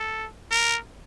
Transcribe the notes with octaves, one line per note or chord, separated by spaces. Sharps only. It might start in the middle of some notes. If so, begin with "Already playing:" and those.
Already playing: A4
A#4